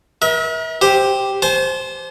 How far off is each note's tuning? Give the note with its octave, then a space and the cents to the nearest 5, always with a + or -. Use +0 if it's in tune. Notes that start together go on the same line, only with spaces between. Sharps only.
A#4 +40 E5 -35
G4 +0 C5 +0
C5 +0 A5 -45